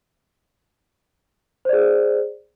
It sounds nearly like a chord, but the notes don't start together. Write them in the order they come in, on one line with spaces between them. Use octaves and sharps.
C5 D5 G#4